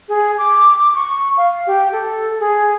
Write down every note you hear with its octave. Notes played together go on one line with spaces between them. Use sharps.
G#4
D6
C#6
F5
G4
A4
G#4